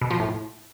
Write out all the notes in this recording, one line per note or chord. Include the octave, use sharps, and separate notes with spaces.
B2
F3
A2